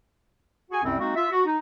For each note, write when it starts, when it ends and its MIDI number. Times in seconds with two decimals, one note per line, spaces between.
0.71 0.81 66
0.71 0.81 68
0.71 0.81 80
0.83 0.98 36
0.83 0.98 42
0.83 0.98 48
0.83 0.98 55
0.83 0.98 60
0.99 1.14 56
0.99 1.14 58
0.99 1.14 60
0.99 1.14 63
0.99 1.14 66
1.15 1.26 65
1.15 1.26 76
1.31 1.41 66
1.45 1.58 63